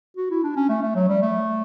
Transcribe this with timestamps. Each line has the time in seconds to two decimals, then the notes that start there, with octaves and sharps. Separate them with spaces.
0.17 F#4
0.31 E4
0.44 D4
0.56 C#4
0.69 A3
0.83 A3
0.95 F#3
1.08 G3
1.22 A3